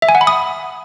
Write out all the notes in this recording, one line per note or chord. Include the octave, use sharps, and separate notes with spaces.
E5
G#5
F#5
B5
D#6